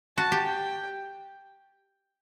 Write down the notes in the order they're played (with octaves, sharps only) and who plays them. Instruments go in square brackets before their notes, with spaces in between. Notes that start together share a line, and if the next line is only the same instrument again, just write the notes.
[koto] F#4 [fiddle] A5
[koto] G4
[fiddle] G5